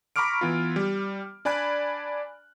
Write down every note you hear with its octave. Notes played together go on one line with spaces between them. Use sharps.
A#5 B5 C#6 D6 F6 D7
E3 B3 F4
G3
D4 D5 G#5 B5 F#6